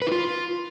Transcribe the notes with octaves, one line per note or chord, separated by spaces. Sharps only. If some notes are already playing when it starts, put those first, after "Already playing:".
B4
E4
F4